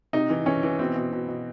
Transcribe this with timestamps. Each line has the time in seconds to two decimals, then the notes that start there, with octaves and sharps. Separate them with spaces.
0.13 C3 D#4
0.30 E3
0.46 E3 C#4
0.63 E3
0.79 B2 C4
0.96 B2
1.12 B2
1.28 B2